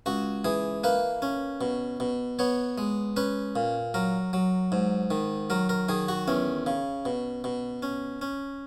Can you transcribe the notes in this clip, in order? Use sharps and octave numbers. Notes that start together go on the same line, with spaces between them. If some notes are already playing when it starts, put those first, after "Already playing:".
C#2 F#4
E3 G#4
A#3 B4
C#4
B2
B2
B3 C#5
G#3
C#4 B4
A#2
F#3 A#4
F#3
G#2
D#3
F#3 A#4
A#4
D#3 G#4
F#4
E2 C#4
C#3
B2
B2
C#4
C#4